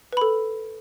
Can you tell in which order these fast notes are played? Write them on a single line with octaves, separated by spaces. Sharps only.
B4 B5 A4